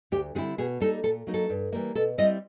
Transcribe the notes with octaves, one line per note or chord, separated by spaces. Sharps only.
D2 G4
D3 G3 C4 E4 G#4
B2 G#4
G3 A#3 D#4 A4
A#2 A4
F#3 A#3 D#4
A4
G2
E3 G3 A#3
B2 A4
G3 C4 E4 D#5